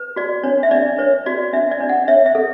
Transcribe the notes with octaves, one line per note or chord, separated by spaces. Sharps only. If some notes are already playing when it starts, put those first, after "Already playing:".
Already playing: B4
F#4 D5
D4 C#5
E5
D4 D5
B4 C#5
F#4 D5
D4 E5
D5
D4
F#5
C#5 E5
E5
A4